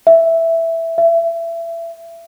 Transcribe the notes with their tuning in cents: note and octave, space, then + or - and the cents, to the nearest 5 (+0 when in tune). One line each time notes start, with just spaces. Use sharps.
E5 +5
E5 +25